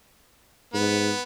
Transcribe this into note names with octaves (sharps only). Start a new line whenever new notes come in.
G#2 B3